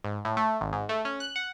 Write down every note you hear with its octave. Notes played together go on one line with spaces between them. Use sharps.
G#2
A2
A3
G#1
G#2
A3
C#4
F#6
F#5